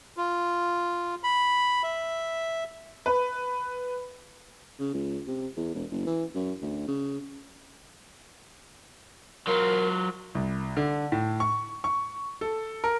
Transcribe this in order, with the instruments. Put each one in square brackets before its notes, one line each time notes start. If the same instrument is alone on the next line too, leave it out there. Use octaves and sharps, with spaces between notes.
[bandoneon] F4
B5
E5
[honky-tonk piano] B4
[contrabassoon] C#3
C#2
C3
E2
E1
F#1
E3
F#2
D2
C#3
[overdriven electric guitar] F#3 F4 [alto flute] A#4
[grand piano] C2
D3
A2
C#6
C#6
A4
A#4